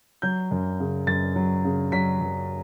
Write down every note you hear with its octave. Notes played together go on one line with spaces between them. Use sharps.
F#3 G6
F#2
C#3
F#2 A6
F#3
C#3
F#3 B6
F#2